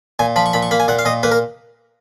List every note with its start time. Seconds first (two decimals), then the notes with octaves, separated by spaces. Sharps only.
0.19 A#2 G#5
0.36 F3 B5
0.46 C#6
0.53 A#2 B5
0.63 C#6
0.71 A#3 B5
0.80 G#5
0.88 A#2 F#5
0.99 F5
1.05 A#2 D#5
1.23 A#3 B4
1.32 A#4